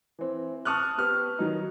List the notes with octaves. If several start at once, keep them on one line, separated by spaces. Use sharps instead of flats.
E3 C4
A5 C#6 D#6 F6 F#6
B3 G4 F6
D#3 F#3 D#4